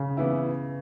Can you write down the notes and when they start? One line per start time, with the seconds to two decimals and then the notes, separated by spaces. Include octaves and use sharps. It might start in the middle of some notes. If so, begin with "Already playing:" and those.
Already playing: C#3
0.17 E3 B3 E4